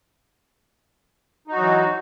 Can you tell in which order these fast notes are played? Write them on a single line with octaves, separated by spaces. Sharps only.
D#4 F#4 F#3 E3